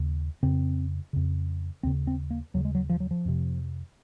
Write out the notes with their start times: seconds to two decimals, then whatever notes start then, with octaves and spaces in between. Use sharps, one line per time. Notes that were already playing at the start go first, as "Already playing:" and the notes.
Already playing: D#2 C#3
0.43 F2 C#3 C4
1.13 F2 C#3
1.83 D#2 C#3 C4
2.07 C4
2.31 A#3
2.54 D#2 C#3 F#3
2.65 G#3
2.75 F#3
2.90 F3
3.00 F#3
3.11 F3
3.25 F2 C3